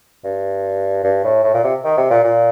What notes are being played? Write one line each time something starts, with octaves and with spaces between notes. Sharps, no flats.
G2
G2
A2
A2
A#2
C3
D#3
C3
A#2
A#2